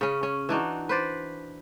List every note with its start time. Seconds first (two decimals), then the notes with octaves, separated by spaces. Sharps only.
0.01 C#3 C#4
0.23 C#4
0.49 E3 D4 D#4 F#4
0.89 B4 C5 D5